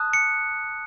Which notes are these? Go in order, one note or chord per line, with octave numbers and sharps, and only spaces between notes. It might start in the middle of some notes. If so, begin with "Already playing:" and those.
Already playing: A5 D#6 F#6
C#7